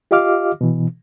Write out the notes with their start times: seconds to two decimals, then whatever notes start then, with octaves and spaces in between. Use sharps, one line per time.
0.11 F4 G4 D#5 F5 D6 F6
0.61 B2 E3